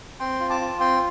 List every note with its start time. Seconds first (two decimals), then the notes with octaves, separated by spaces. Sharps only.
0.20 C4 G5 C6
0.40 F4
0.50 A5 D6
0.61 F4
0.80 C4 G5 C6